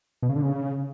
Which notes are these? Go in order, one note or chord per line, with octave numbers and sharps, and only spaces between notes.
B2
C#3
D3
C#3